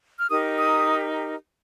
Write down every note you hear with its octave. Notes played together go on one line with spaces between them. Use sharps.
F6
D#4 G4 A#4 D#6
D#6